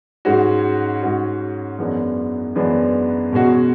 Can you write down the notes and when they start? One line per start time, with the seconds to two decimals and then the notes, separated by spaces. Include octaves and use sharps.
0.25 G#2 G#3 C#4 F#4
1.02 G#2 G#3 C#4 F#4
1.78 F#2 E3 G#3 B3 D4
2.55 F#2 E3 G#3 B3 D4
3.32 B2 G#3 C#4 F#4